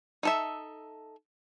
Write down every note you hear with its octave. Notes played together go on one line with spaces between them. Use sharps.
D#4 A4 E5